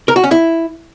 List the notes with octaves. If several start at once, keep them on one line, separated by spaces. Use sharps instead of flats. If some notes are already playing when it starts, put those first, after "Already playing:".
A#4
F#4
C#4
E4